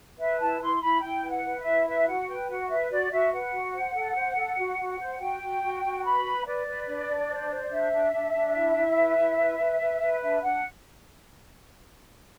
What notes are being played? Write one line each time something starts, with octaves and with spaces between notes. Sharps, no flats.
B4 E5
E4 A5
E4 C6
E4 B5
E4 G5
B4
F#5
B4
E5
E4
B4 E5
F#4 F#5
B4 G5
F#4 F#5
B4 E5
F#4 D5
F#4 E5
B4 F#5
F#4
C5
A4
C5
A4
F#4
F#4
C5
F#4 G5
F#4
F#4
F#4
B4 B5
B4
B4 D5
B4
D4
D4
C5
C5
D4 E5
D4
D4
D4
E4
E4
B4
E4
B4
B4
B4
B4
D4 E5
D4 F#5